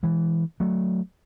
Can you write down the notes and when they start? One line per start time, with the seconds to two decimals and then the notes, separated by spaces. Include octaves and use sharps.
0.03 E3 G#3
0.60 F#3 A3